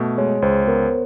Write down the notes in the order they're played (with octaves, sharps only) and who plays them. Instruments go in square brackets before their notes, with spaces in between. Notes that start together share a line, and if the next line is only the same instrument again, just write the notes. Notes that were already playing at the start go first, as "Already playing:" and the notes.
Already playing: [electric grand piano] B2 A3
[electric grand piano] G#3 [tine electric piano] C#5
[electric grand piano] C#2 [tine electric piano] C5
[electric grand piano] B3 [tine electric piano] A#4